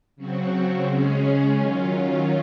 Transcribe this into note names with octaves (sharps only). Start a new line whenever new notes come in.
C#3 F#3 C4 F#4
C#3 G#3 C#4 G#4
D#3 F#3 C#4 F4